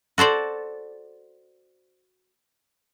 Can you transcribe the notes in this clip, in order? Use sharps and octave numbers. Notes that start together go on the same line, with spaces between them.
F#4 A4 C5 D5